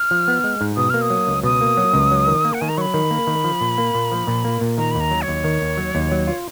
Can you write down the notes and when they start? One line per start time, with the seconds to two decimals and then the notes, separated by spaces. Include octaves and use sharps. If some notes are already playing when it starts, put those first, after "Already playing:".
Already playing: F6
0.11 F3
0.28 B3
0.44 G#3
0.61 G#2
0.77 B2 D#6
0.90 A#3 F6
1.01 D#6
1.10 F#3
1.27 C#2
1.43 B2 D#6
1.61 A#3
1.77 F#3
1.94 C#2
2.11 F#3
2.27 D#3
2.45 A#3
2.54 F#5
2.61 D#3 G#5
2.69 A#5
2.78 F#3 B5 C#6
2.94 D#3
3.11 A#3
3.27 D#3
3.44 F3
3.61 A#2
3.78 A#3
3.94 A#2
4.12 F3
4.27 A#2
4.44 A#3
4.61 A#2
4.78 D#3 A#5
4.91 D#2 B5
5.00 A#5
5.11 F#3
5.22 C#5
5.28 D#2
5.44 D#3
5.62 D#2
5.77 F#3
5.95 D#2
6.12 F#3
6.27 F4